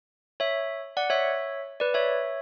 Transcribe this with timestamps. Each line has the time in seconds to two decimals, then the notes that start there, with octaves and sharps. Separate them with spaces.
0.40 C#5 E5
0.97 D5 F#5
1.10 C#5 E5
1.80 B4 D5
1.94 C#5 E5